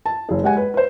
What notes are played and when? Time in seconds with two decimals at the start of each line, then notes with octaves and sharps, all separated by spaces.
0.06 A5
0.29 F#1 G#4
0.43 G#3 G4 F#5 G#5
0.57 B4
0.74 B4 C5